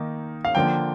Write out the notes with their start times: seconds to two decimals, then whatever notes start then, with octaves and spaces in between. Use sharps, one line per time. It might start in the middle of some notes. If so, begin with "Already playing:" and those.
Already playing: D#3 A#3 D#4
0.45 F5
0.55 D3 F3 A#3 G5